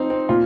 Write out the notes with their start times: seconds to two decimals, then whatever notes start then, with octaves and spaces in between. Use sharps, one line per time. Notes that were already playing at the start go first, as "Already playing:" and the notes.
Already playing: F3 C4 D#4
0.10 C4
0.29 A#2 F4